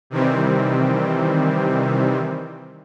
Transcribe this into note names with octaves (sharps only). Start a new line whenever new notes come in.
C3 D#3 E3 G3 C4